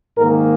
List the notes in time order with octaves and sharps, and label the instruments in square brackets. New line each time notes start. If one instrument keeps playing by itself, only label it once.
[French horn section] G#2 D#3 A#3 A#4